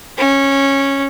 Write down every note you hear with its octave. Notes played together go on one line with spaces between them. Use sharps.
C#4